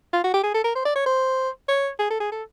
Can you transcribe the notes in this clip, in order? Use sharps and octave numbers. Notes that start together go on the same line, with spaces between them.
F4
F#4
G4
G#4
A4
A#4
C5
D5
C#5
C5
C#5
G#4
A4
G#4
A4